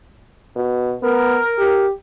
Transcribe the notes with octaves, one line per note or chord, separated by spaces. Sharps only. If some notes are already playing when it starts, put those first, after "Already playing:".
B2
B3 A#4
G4